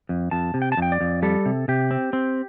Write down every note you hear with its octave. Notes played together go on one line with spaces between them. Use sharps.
F2
F2 A5
C3
G5
A5
F2 G5
D5
F2
G3 A4
C3
C3 G4
C4
C4